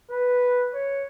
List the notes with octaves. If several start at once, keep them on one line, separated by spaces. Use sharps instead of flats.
B4
C#5